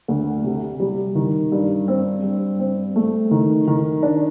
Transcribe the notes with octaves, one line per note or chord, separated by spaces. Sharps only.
D2
C3
G3
D#3
G2
C4
G2
C4
A3
D#3
D#3
D4